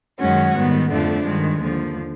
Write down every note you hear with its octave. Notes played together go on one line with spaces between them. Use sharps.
F#2 D#3 G#3 C#4 F#4
G#2 D#3 G3 B3
F2 D3 F3 A3 D4
G2 D#3 G#3
D#2 D3 F3